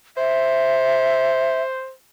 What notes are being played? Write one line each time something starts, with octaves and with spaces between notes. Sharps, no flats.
C5 E5